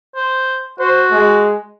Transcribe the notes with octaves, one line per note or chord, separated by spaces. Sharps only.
C5
F#4 C5
G#3